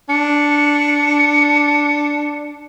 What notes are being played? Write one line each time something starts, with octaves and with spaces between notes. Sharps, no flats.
D4 C#7